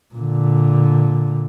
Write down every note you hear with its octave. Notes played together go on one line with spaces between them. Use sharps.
A#2 D3